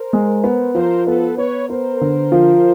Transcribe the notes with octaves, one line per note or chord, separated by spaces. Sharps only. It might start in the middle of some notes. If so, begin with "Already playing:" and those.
Already playing: A#4 C5
G#3
B3
F3 A#4 C5
B3 A4 B4
B3 B4 C#5
B3 A#4 C5
D3
F3